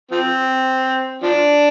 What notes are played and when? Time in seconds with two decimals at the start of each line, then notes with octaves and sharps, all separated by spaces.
0.11 F3 C4
1.22 F3 D4